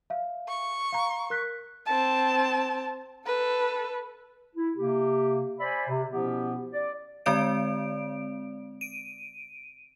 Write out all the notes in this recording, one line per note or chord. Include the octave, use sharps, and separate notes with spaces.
E5 F5
C#6
F5 A#5
A#4 F#6 B6
C4 A5
A4 B4
E4
C3 A#3 G4
C5 D5 E5 G#5 B5
C3
B2 F3 B3 C#4 E4 G4
D5
D3 G#3 C4 D5 D7
D7 D#7